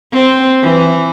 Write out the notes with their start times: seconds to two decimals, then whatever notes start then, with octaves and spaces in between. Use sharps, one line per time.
0.12 C4
0.63 E3